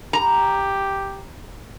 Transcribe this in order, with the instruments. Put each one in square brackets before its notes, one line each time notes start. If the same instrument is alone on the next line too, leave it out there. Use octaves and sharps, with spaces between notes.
[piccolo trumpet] G4 [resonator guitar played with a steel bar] A#5